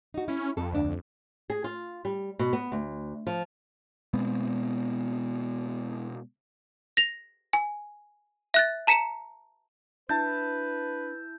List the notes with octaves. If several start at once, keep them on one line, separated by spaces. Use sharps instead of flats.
D#4 F#4
C#4 E4
F2 A4
D2 D4
F2
G#4
F4
G3
B2
B3
D2
F3
B2 G#3 B3 C4
A#6 F7
G#5
E5 F#6 A6
A5 A#5 B6 C#7 D#7 E7
D4 E4 B4 A5 G6